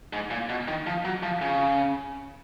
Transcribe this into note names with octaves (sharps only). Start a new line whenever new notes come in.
G#2
A#2
B2
D#3
F3
F#3
F3
C#3